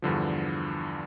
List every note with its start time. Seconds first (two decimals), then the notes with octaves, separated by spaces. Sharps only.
0.02 E2 G2 D3 F3